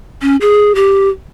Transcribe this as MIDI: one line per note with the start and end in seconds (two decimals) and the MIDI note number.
0.22 0.36 61
0.41 0.73 68
0.75 1.09 67